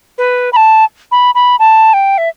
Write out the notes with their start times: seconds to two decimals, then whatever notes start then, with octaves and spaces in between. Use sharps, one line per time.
0.18 B4
0.53 B5
0.56 A5
1.12 B5
1.35 B5
1.59 A5
1.93 G5
2.18 E5